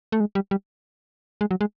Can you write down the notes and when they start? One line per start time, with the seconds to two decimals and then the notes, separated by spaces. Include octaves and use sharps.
0.12 A3
0.20 G#3
0.35 G3
0.51 G3
1.41 G#3
1.51 F#3
1.61 G#3